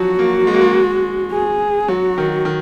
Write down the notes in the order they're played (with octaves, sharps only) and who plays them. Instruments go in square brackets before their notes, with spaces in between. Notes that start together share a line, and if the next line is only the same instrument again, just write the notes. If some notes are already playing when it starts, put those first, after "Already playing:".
Already playing: [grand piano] F3 F#3 [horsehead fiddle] F#4
[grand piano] A#3
G#3
A#3
G#3
[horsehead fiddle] G#4
[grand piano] F#3 [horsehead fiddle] F#4
[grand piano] D#3
D#3